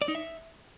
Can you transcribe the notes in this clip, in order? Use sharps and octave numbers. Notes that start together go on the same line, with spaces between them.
D5
D#4
E5